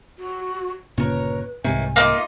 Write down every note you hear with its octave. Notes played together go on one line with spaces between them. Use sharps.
F#4
G1 A#2 C#3 A#4 B4 C#5
C2 G#2 C3 D#3 E3 C#4 G#5
A3 A#3 D#4 F4 D6